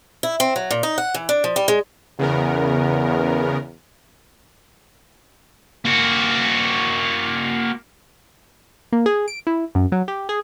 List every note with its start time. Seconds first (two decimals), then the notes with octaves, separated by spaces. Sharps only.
0.23 E4
0.40 C4
0.56 F#3
0.71 A#2
0.83 D#4
0.98 F#5
1.14 E3
1.29 D4
1.44 F3
1.56 G3
1.68 G#3
2.19 E2 C#3 B3 A#4
5.85 A#3 F#4
8.92 A#3
9.06 G#4
9.28 D7
9.47 E4
9.75 F#2
9.92 F#3
10.08 G4
10.29 G#4